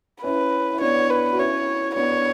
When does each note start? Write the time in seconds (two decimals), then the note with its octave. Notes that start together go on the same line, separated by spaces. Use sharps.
0.23 C#4 E4 B4
0.73 E4
0.81 B3 D4 C#5
1.10 B4
1.32 F#4
1.38 C#4 E4 C#5
1.95 B3 D4 C#5